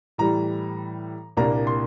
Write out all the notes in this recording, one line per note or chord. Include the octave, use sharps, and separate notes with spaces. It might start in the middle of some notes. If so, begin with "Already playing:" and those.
A2 E3 G3 A#5
C2 A#2 G3 A#3 D4 A#5
C6